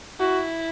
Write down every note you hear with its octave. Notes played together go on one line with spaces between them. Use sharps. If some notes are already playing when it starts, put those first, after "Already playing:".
E4 F#4